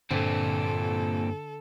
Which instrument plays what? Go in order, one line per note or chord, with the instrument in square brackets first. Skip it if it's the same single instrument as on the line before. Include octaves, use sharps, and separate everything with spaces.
[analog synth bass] G2 [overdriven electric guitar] A#2 C4 [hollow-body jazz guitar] D3 [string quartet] A4